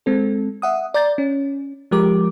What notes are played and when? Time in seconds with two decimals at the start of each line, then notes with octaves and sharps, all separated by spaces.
0.06 G#3 C4 A4
0.62 E5 F#5 D#6
0.94 D5 A#5 G6 A6
1.18 C#4
1.91 F3 G#3 G4 A#4 D6